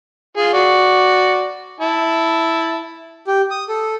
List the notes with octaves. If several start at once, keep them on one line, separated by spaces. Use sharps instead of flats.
F4 G#4
F#4 D5
E4 A5
G4
D#6
A4